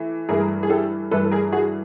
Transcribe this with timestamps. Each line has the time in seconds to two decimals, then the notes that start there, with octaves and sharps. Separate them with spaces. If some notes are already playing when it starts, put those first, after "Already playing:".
Already playing: E3 A3
0.29 G2 E3 A3 G#4 A#4
0.63 G#4
0.70 G4 A4
1.11 G2 E3 A3 A4 B4
1.25 A4
1.31 G#4 A#4
1.52 F#4 G#4